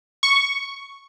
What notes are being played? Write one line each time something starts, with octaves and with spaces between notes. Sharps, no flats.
C#6